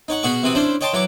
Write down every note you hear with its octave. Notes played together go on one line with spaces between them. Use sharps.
D#4 C#5 F#5
B2 F#4 G#4 F#5 C#6
C3 E3 C4 F#4 D#6
C#4 D4 E4 C5
C#5 D#5 G5 A5 C6
E3 F#3 C#5 D6